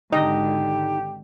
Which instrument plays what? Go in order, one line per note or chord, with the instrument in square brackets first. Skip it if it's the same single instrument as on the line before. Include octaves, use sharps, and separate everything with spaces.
[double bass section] G#1 D3 [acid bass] D#4 [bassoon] G4 [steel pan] D#5